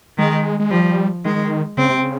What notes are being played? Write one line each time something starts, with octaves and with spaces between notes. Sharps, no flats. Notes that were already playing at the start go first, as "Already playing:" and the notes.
D#3 G#3
G#3
F3 G3
D#3 G#3
C#3 C4
C3
C#3